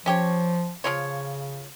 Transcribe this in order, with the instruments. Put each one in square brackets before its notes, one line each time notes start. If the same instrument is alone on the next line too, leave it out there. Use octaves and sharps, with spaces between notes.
[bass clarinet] F3 [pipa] C#4 G4 C#5
[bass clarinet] C#3 [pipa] F3 F4 C#5